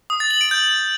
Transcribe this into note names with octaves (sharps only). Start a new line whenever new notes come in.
D#6
A6
F#7
D7
G6